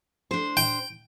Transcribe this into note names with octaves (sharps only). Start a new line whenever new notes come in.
D4 C5
G5